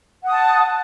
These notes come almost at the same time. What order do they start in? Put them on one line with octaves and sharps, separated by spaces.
F#5 D#6 A5